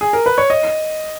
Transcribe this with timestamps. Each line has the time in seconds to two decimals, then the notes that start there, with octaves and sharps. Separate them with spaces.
0.01 G#4
0.13 A#4
0.26 B4
0.38 C#5
0.50 D#5